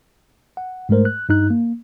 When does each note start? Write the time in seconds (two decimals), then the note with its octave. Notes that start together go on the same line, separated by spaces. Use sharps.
0.57 F#5
0.89 G#2 G#3 A3 A#4 C5
1.05 F#6
1.29 G2 D#4 F#6
1.50 A#3